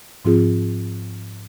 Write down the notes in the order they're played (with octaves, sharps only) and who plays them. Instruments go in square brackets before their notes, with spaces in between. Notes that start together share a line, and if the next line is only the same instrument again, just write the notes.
[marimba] G#2 F3 C4 F4 G#4